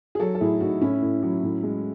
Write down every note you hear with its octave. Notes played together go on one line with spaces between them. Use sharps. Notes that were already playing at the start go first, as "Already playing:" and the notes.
G#4
F#3 F#4 A4
A4
A2 E4 G#4
A2 D#4 F#4
A2 C#4 E4
A2
F#3
A2
G#3